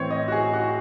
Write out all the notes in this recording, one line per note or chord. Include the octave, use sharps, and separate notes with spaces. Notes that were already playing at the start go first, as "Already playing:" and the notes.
Already playing: A2 E3 C4 C5 C#5
D#5
F#4
G#4
F#4